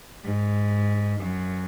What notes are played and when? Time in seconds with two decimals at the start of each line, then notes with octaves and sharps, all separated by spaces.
0.25 G#2
1.21 F#2